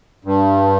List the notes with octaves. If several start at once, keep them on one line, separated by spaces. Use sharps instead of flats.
G2